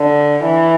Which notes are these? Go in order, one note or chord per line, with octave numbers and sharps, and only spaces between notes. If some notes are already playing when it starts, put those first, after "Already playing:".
Already playing: D3
E3